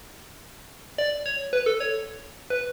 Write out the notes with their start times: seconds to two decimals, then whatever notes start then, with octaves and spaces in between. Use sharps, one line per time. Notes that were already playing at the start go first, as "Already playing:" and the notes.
0.98 D5
1.26 C#5
1.53 B4
1.66 A4
1.80 C#5
2.50 B4